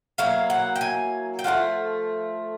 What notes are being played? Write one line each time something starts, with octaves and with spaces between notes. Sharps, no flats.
F#3 A#3 E4 F5
F#5
G5
G#5
G5
F3 A3 D4 F4 F#5